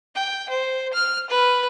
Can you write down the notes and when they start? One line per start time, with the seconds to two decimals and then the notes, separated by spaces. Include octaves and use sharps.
0.15 G5
0.49 C5
0.93 F6
1.30 B4